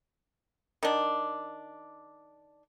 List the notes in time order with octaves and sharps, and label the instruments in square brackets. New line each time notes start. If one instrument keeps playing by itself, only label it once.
[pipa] D#3 D4